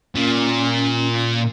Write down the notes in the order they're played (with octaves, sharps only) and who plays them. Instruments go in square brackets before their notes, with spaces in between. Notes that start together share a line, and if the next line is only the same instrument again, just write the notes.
[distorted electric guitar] A#2 [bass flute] C#4